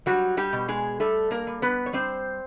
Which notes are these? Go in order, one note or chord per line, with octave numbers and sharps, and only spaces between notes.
F#3 G3 F#4
G3 G4
B2
G#3 G#4
G3 A3 A4
A#3 A#4
G3
B3 B4
C#5
G3 C4 C5